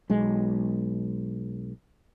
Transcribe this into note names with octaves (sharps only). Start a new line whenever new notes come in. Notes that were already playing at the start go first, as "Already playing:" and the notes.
B1 G#3